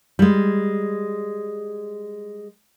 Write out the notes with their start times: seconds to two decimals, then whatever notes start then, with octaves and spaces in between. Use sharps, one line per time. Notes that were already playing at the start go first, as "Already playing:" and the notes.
0.19 G3 G#3